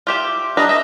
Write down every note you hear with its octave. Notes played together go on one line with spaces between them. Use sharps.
F4 G4 E5
G3 D4 B4 D#5 A#5
D#5 E5